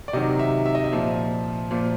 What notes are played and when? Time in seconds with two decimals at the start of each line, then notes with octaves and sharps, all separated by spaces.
0.08 D5
0.13 C3 D#3 F#3 D#5
0.39 E5
0.66 E5
0.75 D#5
0.84 E5
0.92 A#2 F3
1.71 A#2 F3